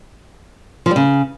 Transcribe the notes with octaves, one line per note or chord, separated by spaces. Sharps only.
F3
G3
C#3